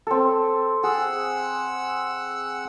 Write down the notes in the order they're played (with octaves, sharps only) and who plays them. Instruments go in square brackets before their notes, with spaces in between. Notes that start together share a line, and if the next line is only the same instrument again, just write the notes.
[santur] C4 A4
[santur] G#4 [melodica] F#5 E6